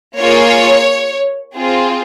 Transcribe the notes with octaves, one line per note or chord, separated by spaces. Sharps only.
A#3 F4 G#4 C#5
C4 F4 G#4